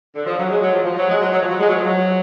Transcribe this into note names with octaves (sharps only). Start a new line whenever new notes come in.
D3
F3
F#3
G#3
F#3
F3
F3
F#3
G#3
F#3
F#3
F3
F#3
G#3
F#3
F3
F#3